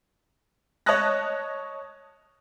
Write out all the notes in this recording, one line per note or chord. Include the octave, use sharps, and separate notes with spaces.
C#5 D#5 A5 D#6 F#6 A#6